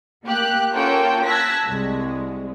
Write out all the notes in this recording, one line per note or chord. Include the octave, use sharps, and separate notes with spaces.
A#3 G4 F#6
A#3 C#4 F4 F#4 A4 G5
A5 E6 F#6 G#6 A#6 B6
C2 G#3